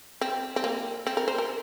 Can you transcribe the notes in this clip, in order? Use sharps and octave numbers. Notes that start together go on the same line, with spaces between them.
C4
C4
A#3
C4
A#4
C5
A#4